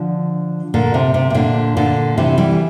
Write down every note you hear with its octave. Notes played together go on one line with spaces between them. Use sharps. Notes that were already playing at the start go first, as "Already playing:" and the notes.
Already playing: D3 F3
A#2 D3
C3
C3
C3
A#2 D3
A#2 D3
C3 E3
E3 G3